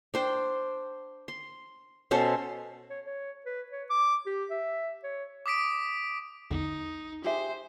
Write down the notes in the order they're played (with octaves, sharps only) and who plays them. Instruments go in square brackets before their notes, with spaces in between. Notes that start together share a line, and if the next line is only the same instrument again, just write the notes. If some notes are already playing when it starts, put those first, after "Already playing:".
[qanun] D4 C5 G5
C6
B2 C#4 A4 C5
[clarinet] C#5
C#5
B4
C#5
D6
G4
E5
C#5
[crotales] D6 D#6 B6 D7
[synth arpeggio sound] A#1 E2 D3 [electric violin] D#4
[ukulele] G4 G#4 E5 [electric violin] C5